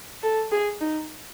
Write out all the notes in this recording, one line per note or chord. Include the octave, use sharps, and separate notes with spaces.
A4
G#4
D#4